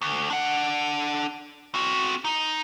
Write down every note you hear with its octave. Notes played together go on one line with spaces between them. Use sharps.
D2
D4 F#5
C4 F#4
D#4